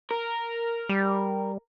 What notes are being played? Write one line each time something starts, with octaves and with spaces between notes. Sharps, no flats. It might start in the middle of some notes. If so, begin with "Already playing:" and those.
A#4
G3